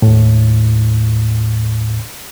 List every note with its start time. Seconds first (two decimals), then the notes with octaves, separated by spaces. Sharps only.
0.02 D#2 A2